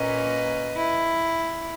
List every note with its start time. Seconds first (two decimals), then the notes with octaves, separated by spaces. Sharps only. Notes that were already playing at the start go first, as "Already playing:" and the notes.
Already playing: A#2 A#3 C#4 B4 D#5
0.77 E4